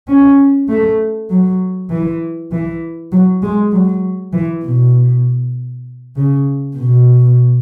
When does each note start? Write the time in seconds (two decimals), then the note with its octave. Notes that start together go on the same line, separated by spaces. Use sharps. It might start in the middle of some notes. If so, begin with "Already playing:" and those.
0.08 C#4
0.69 A3
1.30 F#3
1.90 E3
2.52 E3
3.12 F#3
3.43 G#3
3.72 F#3
4.34 E3
4.64 B2
6.16 C#3
6.76 B2